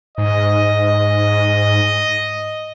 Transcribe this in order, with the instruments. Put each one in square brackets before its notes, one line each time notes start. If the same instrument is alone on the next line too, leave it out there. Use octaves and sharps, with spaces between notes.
[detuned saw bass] G#2 [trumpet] D#5